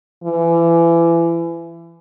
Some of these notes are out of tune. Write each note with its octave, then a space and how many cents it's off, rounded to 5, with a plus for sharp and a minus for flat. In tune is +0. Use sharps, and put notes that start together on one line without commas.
E3 +30